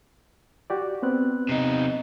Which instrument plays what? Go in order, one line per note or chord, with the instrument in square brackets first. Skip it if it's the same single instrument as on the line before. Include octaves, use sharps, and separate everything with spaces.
[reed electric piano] F#4 G4 D5
B3 C4 F#6
[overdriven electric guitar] C3 D#4